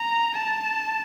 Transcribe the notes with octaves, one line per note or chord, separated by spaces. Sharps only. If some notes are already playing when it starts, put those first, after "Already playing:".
Already playing: A#5
A5